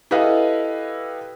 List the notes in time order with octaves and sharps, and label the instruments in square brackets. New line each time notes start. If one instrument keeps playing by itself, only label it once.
[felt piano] E4 G4 A4 B4 D#5 F5